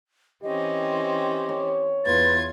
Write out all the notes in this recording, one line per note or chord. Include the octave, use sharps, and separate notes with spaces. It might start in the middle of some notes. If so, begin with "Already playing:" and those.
E3 C4 C#4 G4 D#5
C#5
E2 F4 B4 G#6 A6